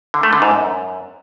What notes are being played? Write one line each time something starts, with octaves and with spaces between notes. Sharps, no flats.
D3
A3
D3
G#2
F#2